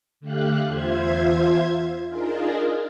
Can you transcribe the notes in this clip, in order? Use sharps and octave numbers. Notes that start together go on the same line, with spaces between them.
D3 A3 G4 F5 F#6
E2 F4 C5 E5 G#6
D4 D#4 F4 G#4 A#4